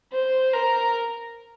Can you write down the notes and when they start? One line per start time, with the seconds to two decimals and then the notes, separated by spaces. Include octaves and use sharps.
0.12 C5
0.53 A#4